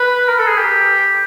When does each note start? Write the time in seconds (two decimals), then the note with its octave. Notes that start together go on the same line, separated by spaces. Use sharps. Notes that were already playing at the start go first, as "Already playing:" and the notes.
Already playing: B4
0.28 A#4
0.38 A4
0.47 G#4
0.58 G4